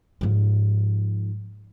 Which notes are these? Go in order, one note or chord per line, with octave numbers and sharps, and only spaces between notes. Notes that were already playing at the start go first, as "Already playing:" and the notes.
G#2 F3